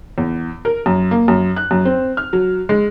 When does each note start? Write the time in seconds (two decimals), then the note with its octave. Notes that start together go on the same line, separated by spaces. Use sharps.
0.18 E2
0.65 A#4
0.86 F#2
1.11 A#3
1.28 F#2
1.56 F#6
1.71 F#2
1.85 C4
2.17 F6
2.33 F#3
2.69 G#3